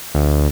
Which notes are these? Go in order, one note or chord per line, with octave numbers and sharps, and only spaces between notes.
D2